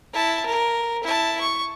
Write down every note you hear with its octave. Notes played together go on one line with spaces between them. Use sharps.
E4 A5
A#4
E4 A5
C#6